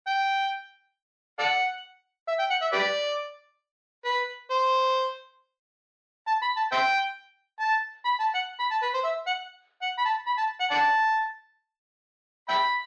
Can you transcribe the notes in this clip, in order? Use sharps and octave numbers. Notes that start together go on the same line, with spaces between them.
G5
A4 D5 F#5
E5
G5
F#5
E5
G4 B4 D5
B4
C5
A5
B5
A5
C5 E5 G5
A5
B5
A5
F#5
B5
A5
B4
C5
E5
F#5
F#5
B5
A5
B5
A5
F#5
D5 F#5 A5
E5 G5 B5